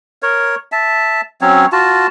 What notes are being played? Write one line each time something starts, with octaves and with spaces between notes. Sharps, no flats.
A#4 C#5
E5 A5
F#3 C4 C#4 C#5
F4 F#4 A5